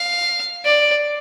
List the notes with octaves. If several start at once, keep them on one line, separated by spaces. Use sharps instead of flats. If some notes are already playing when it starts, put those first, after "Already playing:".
Already playing: F5
D5